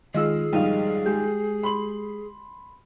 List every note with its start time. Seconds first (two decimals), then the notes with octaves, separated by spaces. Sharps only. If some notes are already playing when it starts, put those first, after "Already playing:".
0.14 D#3 G#3 F4 G#4 E6
0.53 A#1 G#2 D#3 G3 D#5 F5
1.06 G#3 G4
1.63 B5 C6 F#7